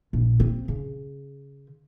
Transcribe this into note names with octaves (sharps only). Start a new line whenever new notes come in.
A#1
C4
C#3